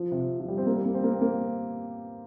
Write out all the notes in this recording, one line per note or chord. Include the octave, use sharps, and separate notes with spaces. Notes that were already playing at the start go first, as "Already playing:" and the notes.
Already playing: F3
C3
F3
G3
C4
A#3
G3
A#3
C4
A#3
C4
A#3